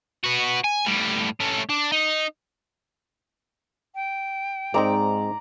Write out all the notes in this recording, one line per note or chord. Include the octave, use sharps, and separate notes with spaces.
B3 F#4
G#5
A2 G3
A3 C#4
D4
D#4
G5
G#2 G#3 C4 D#4 D5 A#5